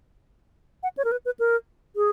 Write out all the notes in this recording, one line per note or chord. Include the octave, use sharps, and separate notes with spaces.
F#5
C#5
A#4
B4
B4
A#4
G#4